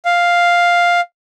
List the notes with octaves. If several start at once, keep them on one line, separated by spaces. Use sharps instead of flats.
F5